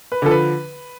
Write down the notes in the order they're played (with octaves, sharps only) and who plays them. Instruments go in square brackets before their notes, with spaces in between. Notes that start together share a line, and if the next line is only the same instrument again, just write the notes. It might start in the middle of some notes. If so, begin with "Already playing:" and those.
[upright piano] B4
D3 F3 A4
B4